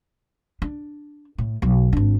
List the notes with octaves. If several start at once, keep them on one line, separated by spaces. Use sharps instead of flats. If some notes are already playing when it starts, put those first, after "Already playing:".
D4
A2
B1 F#3
G#1 D4